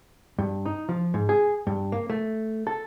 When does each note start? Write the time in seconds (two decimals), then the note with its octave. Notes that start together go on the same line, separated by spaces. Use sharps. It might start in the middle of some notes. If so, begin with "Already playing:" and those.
0.39 G2
0.66 D#4
0.89 F3
1.14 G#2
1.29 G#4
1.67 G2
1.92 A#3
2.10 A3
2.67 A4